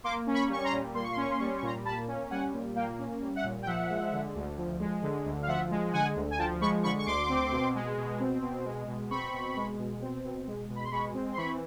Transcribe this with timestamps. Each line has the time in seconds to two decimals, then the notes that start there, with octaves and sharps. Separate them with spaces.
0.04 A#3 C6 D6
0.27 C#4
0.34 B5 C#6
0.49 G3 C#6
0.64 A#5 C6
0.72 A#2
0.94 A#3 C6
1.04 C#6
1.12 C6
1.17 C#4 C#6
1.31 C6
1.39 G3 C#6
1.48 C6
1.57 C#6
1.62 A#2 A#5 C6
1.85 A#3 A5 B5
2.07 C#4
2.30 G3 F#5 G#5
2.53 A#2
2.75 A#3 F5 G5
2.99 C#4
3.21 G3
3.36 E5 F#5
3.44 A#2
3.63 G5
3.66 F3 E5 F#5
3.90 G#3
4.12 D3
4.35 D2
4.57 F3
4.80 G#3
5.03 D3
5.25 D2
5.42 F5
5.47 F3 E5 F#5
5.71 G#3
5.93 D3 F#5 G#5
6.16 D2
6.31 G#5
6.39 F3 G5 A5
6.61 G#3 B5 C#6
6.83 D3 B5 C#6
6.99 C#6
7.06 D2 C6 D6
7.29 C4
7.52 B2
7.75 G#3
7.97 B2
8.20 C4
8.42 B2
8.65 G#3
8.88 B2
9.11 C4 B5 C#6
9.33 B2
9.56 G#3
9.79 B2
10.02 C4
10.24 B2
10.47 G#3
10.69 B2
10.76 B5
10.84 C6
10.91 G#3 B5 C#6
11.14 C4
11.33 C6
11.37 E3 B5 C#6